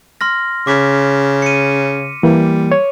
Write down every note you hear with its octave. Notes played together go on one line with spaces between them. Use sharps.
C6 F6 A#6
C#3 D6 B6
C#7 D#7
E3 G3 A#3
C#5